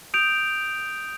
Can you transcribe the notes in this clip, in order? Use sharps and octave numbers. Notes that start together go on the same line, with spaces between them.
D#6 G6 D7 F7